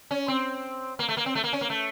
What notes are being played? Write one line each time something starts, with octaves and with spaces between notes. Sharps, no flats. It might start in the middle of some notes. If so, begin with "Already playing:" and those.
C#4
C4
A#3
A3
A#3
C4
A3
A#3
C#4
A#3
A3